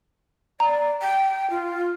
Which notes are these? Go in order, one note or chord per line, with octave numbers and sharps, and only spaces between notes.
D5 A#5
G5
F4